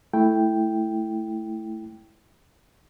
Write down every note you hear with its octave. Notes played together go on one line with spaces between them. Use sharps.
A3 E4 G5